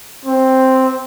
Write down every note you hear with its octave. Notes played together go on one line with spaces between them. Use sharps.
C4